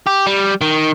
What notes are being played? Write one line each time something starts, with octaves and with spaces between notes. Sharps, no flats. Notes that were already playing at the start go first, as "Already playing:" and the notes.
G4
G3
D#3